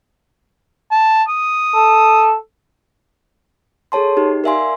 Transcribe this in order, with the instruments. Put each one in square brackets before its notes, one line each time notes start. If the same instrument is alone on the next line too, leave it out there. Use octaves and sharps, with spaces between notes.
[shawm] A5
D#6
[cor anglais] A4
[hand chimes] G#4 A4 C#5 A5 C6
D#4 G4
A#4 D5 E5 F5 G#5 C6